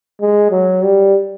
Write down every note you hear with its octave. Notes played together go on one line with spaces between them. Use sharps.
G#3
F#3
G3